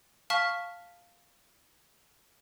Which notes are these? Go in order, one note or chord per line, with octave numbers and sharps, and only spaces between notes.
F5 A5 C#6 F6 B6